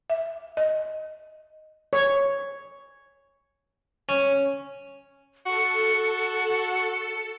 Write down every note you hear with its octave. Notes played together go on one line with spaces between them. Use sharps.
E5
D#5
C#5
C#4
F#4 A4 C#7